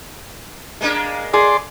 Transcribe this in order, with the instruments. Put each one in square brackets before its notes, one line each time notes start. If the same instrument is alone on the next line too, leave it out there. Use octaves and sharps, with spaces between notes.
[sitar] G#3 A#3 D4
[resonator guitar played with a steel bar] G#4 [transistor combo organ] D5 C6